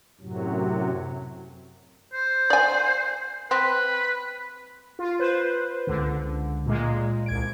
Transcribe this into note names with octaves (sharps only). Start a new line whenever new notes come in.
F#2 A2 C3 F#3
C5
D5 G#5
C4 B4
F4
B4 C5
C#2 D3
A#2 G#3
C2 G#6 D7